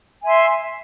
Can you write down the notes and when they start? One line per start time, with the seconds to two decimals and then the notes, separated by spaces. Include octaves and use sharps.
0.21 G#5
0.24 E5
0.26 C6